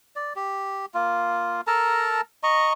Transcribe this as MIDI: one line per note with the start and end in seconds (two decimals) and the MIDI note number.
0.16 0.33 74
0.36 0.86 67
0.94 1.61 58
0.94 1.61 65
1.67 2.21 69
1.67 2.21 70
1.67 2.21 81
1.67 2.21 82
2.43 2.73 75
2.43 2.73 82
2.43 2.73 85